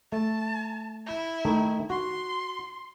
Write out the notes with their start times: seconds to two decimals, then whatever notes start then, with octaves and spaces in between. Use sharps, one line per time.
0.12 A3 A5
1.06 E4
1.45 D#3 A3 D#4
1.90 F#4 C6